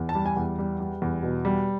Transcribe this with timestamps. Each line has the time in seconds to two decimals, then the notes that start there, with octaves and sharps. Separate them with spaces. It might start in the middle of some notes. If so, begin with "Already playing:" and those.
Already playing: E2
0.09 A5
0.15 G3
0.26 G#5
0.37 E2
0.58 G3
0.80 G3
1.02 E2
1.23 B2
1.45 G3